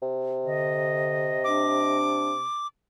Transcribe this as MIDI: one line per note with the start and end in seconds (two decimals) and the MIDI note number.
0.02 2.45 48
0.46 1.39 50
0.46 1.98 75
1.44 2.33 62
1.44 2.67 86